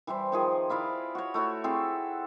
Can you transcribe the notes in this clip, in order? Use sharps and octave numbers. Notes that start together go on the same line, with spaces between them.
E3 G3 E4 C5
D#3 F3 G#4
E4 D5 F5 B5
F#4 C#5
A3 E4 F#4 C#5
C4 E4 G#4 A4